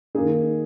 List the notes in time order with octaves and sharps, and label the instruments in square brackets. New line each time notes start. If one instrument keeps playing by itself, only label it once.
[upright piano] D#3 A#3 D#4 G#4